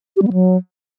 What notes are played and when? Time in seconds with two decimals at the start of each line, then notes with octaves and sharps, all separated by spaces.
0.16 G4
0.22 G3
0.27 B3
0.33 F#3